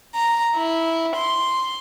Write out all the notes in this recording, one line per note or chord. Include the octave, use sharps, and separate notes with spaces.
A#5
E4
C6